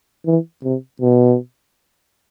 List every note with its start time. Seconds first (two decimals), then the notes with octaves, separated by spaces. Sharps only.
0.26 E3
0.63 C3
1.01 B2